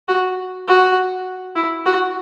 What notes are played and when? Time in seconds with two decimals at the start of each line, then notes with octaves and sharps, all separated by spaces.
0.08 F#4
0.68 F#4
1.56 E4
1.86 F#4